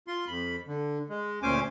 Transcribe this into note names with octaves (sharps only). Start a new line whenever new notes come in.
F4 C6
F2 B5
D3
G#3
D2 A#2 C#4 C5 G#5 D6